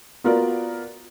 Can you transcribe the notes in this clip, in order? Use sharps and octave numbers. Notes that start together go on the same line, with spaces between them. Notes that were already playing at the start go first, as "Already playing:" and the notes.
B3 F4 F#4 A#4 D5